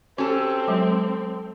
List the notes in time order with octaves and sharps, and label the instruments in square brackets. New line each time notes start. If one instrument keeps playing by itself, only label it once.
[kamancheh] C4 [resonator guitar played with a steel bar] C#4 A4 [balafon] F#4 G4
[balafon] F#3 G#3